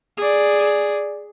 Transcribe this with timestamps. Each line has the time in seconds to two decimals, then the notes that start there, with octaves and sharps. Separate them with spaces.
0.17 G#4 D5